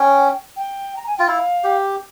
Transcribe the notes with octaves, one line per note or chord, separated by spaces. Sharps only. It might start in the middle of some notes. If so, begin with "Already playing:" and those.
Already playing: C#4 G5
G5
A#5
G#5
F4 G5
E4 F5
G4